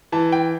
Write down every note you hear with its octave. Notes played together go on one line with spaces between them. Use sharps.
E3 A5
G5